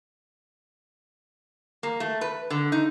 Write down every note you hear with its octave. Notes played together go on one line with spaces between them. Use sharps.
A#3
A3
B4
D3
D#4